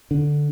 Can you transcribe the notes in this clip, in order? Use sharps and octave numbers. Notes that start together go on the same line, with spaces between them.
D3